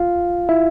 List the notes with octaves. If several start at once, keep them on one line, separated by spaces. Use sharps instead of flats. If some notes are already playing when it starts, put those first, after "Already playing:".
Already playing: F4 F5
E4 E5